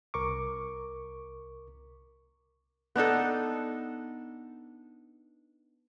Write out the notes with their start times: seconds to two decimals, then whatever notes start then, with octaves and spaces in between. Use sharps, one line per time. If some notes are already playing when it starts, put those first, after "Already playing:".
0.14 C2 A#4 C#6 D6
2.96 B3 D4 D#4 A4